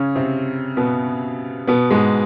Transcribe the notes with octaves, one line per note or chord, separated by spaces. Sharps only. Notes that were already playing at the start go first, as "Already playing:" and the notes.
Already playing: C#3 C#4
C3 C4
B2 B3
B2 B3
G#2 G#3